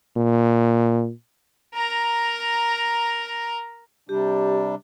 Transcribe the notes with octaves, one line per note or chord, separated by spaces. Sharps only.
A#2
A#4 A#5
C3 G3 D4 G4